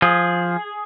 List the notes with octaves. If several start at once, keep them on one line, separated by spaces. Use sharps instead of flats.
F3 G#4